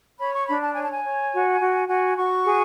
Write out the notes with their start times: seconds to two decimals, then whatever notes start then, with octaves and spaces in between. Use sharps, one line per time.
0.19 C#5 B5
0.33 C#6
0.47 D4 B5
0.61 A5
0.75 C#5 G#5
0.83 A5
0.91 G#5
1.04 C#5
1.32 F#4
1.60 F#4
1.88 F#4 G#5
2.17 F#4 C#6
2.46 G#4